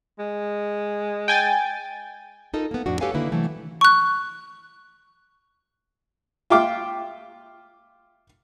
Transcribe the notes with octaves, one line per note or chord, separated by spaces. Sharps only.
G#3
G5 G#5 A6
D#4 F4 A4 A#4 D#5
A#3 B3
F2 A2 D4 D#4 F#4
G4 A4 B4 C#5 F5 G#5
D3 D#3 A#3 E4 B4
C3 E3 F#3 A3
C#6 F#6
F4 E5 G5 D6 F6